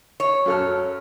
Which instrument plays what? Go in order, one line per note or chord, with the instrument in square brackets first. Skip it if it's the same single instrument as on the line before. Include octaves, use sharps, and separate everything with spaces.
[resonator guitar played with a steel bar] C#5
[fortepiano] F#2 A4 F6